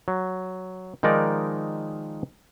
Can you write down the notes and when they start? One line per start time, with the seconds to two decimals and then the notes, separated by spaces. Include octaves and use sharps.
0.08 F#3
1.03 D#3 F3 G#3 D#4 A#4 D5